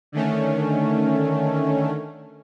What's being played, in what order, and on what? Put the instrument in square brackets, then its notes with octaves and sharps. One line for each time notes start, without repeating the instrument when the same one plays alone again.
[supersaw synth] D3 D#3 A3 C#4